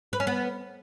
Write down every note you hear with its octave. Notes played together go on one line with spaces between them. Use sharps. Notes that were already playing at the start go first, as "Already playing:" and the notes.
B4
C#4
B3